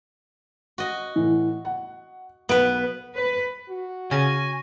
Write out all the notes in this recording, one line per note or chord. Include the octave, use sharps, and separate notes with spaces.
F#4 D#5
A2 E3
F#5
B1 B3 B4 D7
B4
F#4
C#3 G#5 C#6 A#6 D#7